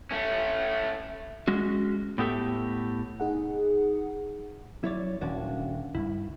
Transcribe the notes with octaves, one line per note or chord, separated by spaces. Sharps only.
A3 C#4
G#3 C#4 F#4
A2 B3 G4 A4 E5
D#4 G#4 F#5
F#3 E4 C#5 D5
D#1 D#3 C#4 D4 F#4
C#2 G2 E4